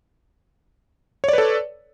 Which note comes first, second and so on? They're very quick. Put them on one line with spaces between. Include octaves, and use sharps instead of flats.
C#5 D5 B4 A4